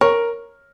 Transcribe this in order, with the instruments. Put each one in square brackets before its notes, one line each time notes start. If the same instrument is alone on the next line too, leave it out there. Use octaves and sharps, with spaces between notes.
[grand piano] A#4 [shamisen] C#5